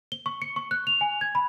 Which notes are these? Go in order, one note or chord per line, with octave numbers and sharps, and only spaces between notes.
G7
C#6
C#7
C#6
F#6
F7
G#5
G#6
B5